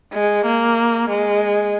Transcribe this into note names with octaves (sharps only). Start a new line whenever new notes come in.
G#3
A#3
G#3